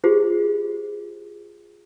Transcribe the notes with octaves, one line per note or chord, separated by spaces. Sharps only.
F4 G4 G#4 C5